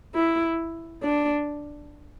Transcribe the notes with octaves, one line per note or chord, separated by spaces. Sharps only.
E4
D4